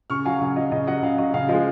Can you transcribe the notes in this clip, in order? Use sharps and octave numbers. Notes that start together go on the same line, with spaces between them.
C#3 C#6 F6
F#3 F5 G#5
C#3 F5
F#3 D#5
C#3 D#5
F#3 D#5 F#5
C#3 F5
F#3 D#5
C#3 F5
F3 G#3 D#5